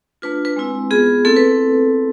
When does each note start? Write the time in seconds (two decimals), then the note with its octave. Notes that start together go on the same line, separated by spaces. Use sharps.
0.22 A3 D4 F4 B4
0.45 B4
0.56 G#3 C4 E4
0.91 B3 F4 G#4
1.25 A3 C4 E4 A4
1.37 B4